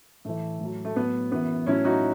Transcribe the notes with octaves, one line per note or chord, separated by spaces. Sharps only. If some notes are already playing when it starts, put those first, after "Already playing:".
A2 E3 A3
A2 F#3
A3
A2 F#3 B3
F#2 E3 B3
A2 F#3 C#4 E4
D#4 F#4